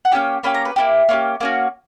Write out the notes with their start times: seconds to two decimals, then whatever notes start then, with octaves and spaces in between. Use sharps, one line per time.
0.05 F#5
0.12 A#3 C#4 E4 G4 G5
0.43 A#3 C#4 G4 B5
0.54 A#5
0.65 B4
0.76 A#3 C#4 E4 G4
1.09 A#3 C#4 E4 G4
1.41 A#3 C#4 F#4